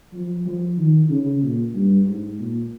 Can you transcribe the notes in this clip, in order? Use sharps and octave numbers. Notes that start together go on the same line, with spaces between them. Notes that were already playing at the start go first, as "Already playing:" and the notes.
F3
F3
D#3
C#3
A#2
G2
G#2
A#2